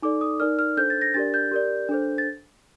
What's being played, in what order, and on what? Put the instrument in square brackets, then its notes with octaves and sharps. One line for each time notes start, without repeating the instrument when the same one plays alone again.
[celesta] D#4 A4 D5 D6
D#6
D#4 A#4 D5 F6
F6
D4 A4 C5 G6
A6
A#6
D4 G4 A#4 D5 A6
G6
G4 A#4 D5
D4 A4 C5
A6